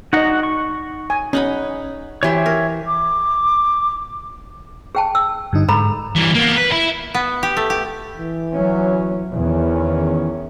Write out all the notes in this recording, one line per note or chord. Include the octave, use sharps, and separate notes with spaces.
D#4 F#4 D5 D#5 F#5 A#5
C#6
G#5
C#4 D#4 F#5 B5
E3 G4 C5 C#5 E5
A#4
D6
G#4 G5 A5
E6
G2 D3 D#4
G#2 A4 A#5 B5
E3 G3
A#3 B3
B4
E5 B5
B3
G4
A3
G4
E3
F#3 C#4
E2 D#3 E3 C#4